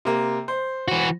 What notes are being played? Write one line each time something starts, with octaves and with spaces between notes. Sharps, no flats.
C3 A#3
C5
E3 F#4